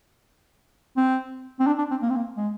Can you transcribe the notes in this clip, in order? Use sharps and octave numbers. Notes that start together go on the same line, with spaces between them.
C4
C4
D4
D4
C4
A#3
C4
A#3
G#3